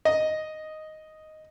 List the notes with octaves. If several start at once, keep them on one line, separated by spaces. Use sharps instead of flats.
D#5